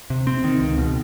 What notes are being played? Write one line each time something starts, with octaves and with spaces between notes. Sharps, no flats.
C3
C4
D#3
C#2
B2